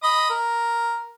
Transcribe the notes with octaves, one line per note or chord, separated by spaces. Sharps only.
D#5 B5 D#6
A#4